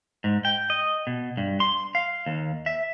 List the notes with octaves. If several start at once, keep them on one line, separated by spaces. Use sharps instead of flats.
G#2
G5
D#5
B2
G2
C6
F5
D#2
E5